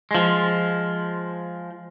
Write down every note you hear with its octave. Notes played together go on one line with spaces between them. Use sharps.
F3 G#3